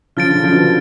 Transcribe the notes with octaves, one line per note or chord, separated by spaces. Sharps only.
C#3 F3 F6 A6 D7
D3
C#3
F3
B2 D3